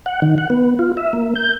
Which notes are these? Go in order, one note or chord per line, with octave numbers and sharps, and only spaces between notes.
F#5
D#3
F#5
B3
F4
E5
A#3
G6